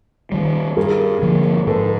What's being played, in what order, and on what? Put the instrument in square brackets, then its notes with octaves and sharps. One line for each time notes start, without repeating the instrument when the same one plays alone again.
[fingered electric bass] D#3 G3
[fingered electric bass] G2 [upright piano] G#4 A#4
[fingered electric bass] D3 F3 A#3
[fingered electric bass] G#2 [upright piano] A4 B4